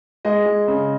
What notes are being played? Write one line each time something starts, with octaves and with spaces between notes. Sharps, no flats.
G#3 D#5
G#3
C#3